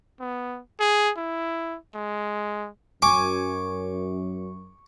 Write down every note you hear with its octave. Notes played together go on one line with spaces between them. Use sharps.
B3
G#4
E4
G#3
F#2 G#5 C#6 D6